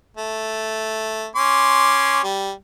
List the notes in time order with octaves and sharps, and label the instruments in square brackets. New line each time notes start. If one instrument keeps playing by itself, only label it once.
[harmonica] A3
C#4 C6 D6
G3